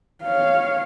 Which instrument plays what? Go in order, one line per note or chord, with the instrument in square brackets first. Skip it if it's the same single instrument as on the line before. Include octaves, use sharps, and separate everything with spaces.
[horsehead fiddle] C#5 F5